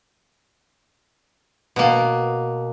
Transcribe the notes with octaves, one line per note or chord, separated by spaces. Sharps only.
B2 A#3